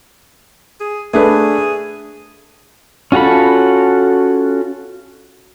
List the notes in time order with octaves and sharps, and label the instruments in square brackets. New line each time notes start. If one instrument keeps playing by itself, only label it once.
[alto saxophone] G#4
[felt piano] A3 D4 B4 [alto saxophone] G#4
[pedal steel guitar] C#4 F4 F#4 A4 B5